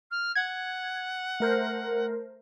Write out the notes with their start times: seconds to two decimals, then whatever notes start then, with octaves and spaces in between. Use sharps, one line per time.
0.11 F6
0.35 F#5 G#6
1.40 A3 A#4 C5